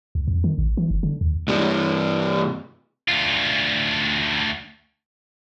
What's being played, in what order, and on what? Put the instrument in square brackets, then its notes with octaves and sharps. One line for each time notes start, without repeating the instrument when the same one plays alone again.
[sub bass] C#2
F2
D#3
A1
E3
F#1
D3
D#2
[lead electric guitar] G2 C3
[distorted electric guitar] D2 F4